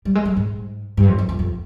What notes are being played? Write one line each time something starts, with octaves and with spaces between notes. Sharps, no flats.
G3
G#3
G3
G#2
G2
F2
F2
F2
F2